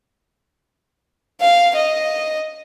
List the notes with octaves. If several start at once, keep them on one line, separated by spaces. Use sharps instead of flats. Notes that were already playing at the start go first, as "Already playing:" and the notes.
F5
D#5